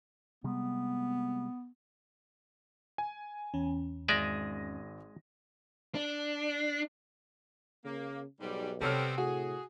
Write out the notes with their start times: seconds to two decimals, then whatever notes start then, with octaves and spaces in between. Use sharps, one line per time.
0.44 C3 G3 G#3 B3
2.98 G#5
3.54 E2 C#4
4.08 G#1 G#3 D5 E5 A#6 D#7
5.95 D4
7.85 C#3 A#3
8.40 B1 G#2 G3
8.81 C3 G3 B3 C4 A4 C#5 F6
9.18 A2 F#4 G#4